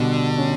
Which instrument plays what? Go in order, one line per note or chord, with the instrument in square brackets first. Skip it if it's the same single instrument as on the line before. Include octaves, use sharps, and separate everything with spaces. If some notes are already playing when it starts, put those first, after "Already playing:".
Already playing: [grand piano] B2 G3 [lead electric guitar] D3
[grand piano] C#4